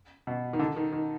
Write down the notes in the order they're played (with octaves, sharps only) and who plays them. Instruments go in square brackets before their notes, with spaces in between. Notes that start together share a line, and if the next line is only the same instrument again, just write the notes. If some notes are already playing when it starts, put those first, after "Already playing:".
[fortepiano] B2
D#3
D3
D#3
D#3